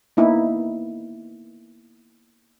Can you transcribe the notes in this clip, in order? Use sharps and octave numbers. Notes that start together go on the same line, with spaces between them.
A#3 B3 D#4 E4